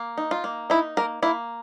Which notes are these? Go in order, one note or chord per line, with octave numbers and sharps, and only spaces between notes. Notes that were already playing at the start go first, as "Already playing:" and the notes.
Already playing: A#3
D#4
F4
A#3
D#4 E4
A#3 A#4
A#3 E4